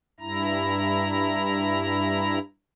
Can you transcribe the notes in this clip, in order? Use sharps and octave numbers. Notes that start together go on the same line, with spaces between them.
G2 E4 A#5